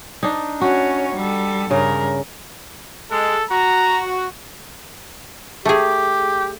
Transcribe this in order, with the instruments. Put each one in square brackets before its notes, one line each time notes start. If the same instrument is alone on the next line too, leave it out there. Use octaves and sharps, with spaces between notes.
[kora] D4 D#4
[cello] C#4 C#5 [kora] F#4
[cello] G3 A4
[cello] G2 A#4 [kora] C#3
[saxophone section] G#3 [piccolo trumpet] A4
[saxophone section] F#4 [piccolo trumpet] A#5
[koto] A3 G#4 [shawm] G4